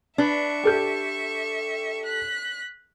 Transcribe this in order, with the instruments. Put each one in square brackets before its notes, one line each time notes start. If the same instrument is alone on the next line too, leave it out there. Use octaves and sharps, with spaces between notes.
[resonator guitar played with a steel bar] D4 B4 [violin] E5 C#6
[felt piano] G4 A4 G6
[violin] F#6 B6